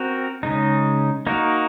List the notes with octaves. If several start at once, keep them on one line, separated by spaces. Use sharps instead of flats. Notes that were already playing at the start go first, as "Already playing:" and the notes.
Already playing: C4 F#4 A#4
C#3 G#3 D#4
A#3 D#4 F#4 A#4